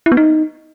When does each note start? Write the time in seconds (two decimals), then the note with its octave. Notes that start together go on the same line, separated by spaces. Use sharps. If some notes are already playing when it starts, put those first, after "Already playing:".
0.06 E4
0.12 B3
0.17 D#4